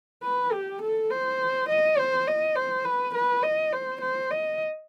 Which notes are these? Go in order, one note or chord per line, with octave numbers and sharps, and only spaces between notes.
B4
G4
A4
C5
D#5
C5
D#5
C5
B4
B4
D#5
C5
C5
D#5